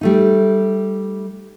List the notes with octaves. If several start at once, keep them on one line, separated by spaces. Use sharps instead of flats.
G3 A3 D#4